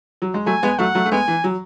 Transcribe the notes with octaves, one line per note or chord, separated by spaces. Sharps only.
F#3
G#3
F#3 A3 G#5
G#3 B3
F#3 A3 F#5
F#3 A3
A3
G#3 B3 G#5
E3
F#3